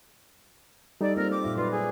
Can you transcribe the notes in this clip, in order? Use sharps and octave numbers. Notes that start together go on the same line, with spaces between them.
G3 D#4 A4 D5
A#3 C4 F4 A#4
D6
A#2 F4 E5
F#3 F4 B4 D5
G#4